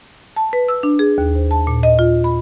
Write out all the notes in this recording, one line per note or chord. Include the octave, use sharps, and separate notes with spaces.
A5
B4
E6
D4
G#4
D#2
C5
A5
A#2
D#5
F4
B5